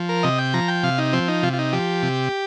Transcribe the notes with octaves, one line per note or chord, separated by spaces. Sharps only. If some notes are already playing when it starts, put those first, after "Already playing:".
Already playing: F3
A#4
C3 D#5
G5
F3 A#5
G5
C3 F5
D#4
F3 C4
D#4
C3 F4
F4
D#4
F3 G4
C3